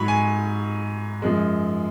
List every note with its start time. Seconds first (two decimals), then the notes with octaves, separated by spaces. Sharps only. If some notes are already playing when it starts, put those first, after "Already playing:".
Already playing: G#2 F#3 B5 C#6
0.08 G#5
1.22 F#2 F3 G#3